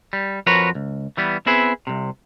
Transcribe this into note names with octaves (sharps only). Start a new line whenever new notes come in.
G3
F2 F3 F#4 A#4 B4 C#5
C#2
E3 G3 B3
B3 C4 E4 G#4 B4
C2 C3